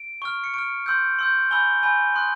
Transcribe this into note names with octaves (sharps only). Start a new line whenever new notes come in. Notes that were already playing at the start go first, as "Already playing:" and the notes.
Already playing: D7
C#6 F6
C#7
C#6 F6 D7
C6 E6 G6
C6 E6 G6
G#5 B5 E6 G6 G7
G#5 B5 E6 G6
C6 D#6 F#6